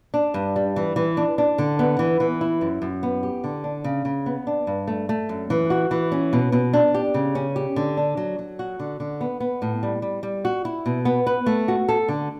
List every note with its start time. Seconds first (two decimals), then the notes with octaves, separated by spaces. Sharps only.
0.14 D4
0.34 G2
0.56 G3
0.76 E3
0.96 E3
1.17 D4
1.38 D4
1.58 D3
1.79 B3
1.99 E3
2.20 E3
2.41 E4
2.61 F#2
2.82 F#2
3.03 B3
3.23 G4
3.44 D3
3.64 D4
3.84 C#3
4.05 C#3
4.26 B3
4.47 D4
4.67 G2
4.87 A3
5.09 A3
5.29 F#2
5.50 E3
5.70 F#4
5.91 E3
6.12 C#4
6.33 B2
6.52 B2
6.73 D4
6.95 G4
7.14 C#3
7.35 C#4
7.56 G4
7.76 D3
7.97 D4
8.17 F#3
8.39 F#3
8.59 F#4
8.79 D3
9.00 D3
9.21 B3
9.40 B3
9.62 A2
9.83 G3
10.02 G3
10.23 G3
10.45 F#4
10.65 E4
10.86 B2
11.05 B3
11.27 B4
11.46 A3
11.68 F#4
11.89 A4
12.08 D3